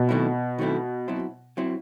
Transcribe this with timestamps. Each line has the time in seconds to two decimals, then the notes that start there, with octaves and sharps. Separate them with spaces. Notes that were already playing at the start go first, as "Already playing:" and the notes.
Already playing: B2
0.09 D#3 F#3 A3 C4 E4
0.58 D#3 F#3 A3 C4 E4
1.08 F#3 C4 E4
1.57 F#3 C4 E4